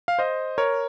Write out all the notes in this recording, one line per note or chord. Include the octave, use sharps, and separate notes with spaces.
F5
C5 D#5
A#4 C#5